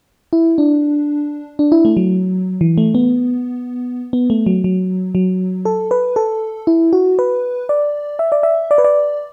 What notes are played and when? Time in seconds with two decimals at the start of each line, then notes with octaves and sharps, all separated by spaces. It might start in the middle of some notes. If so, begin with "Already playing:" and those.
0.33 E4
0.58 D4
1.59 D4
1.72 E4
1.85 A3
1.97 F#3
2.61 E3
2.78 A3
2.95 B3
4.13 B3
4.30 A3
4.46 F#3
4.64 F#3
5.15 F#3
5.65 A4
5.91 B4
6.16 A4
6.67 E4
6.93 F#4
7.19 B4
7.69 D5
8.19 E5
8.32 D5
8.43 E5
8.71 D5
8.78 B4
8.84 D5